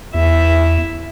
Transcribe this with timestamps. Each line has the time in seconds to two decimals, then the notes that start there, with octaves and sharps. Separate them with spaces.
0.15 E2 E4 E5